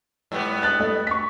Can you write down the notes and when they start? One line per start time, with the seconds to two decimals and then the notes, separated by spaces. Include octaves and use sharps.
0.32 G#2 G3 B3
0.63 D#6 F#6 A6
0.80 A3 D#5
1.07 C#6 B6